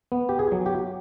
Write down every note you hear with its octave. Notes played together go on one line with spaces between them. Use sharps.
B3
G4
G#4
F#3
G4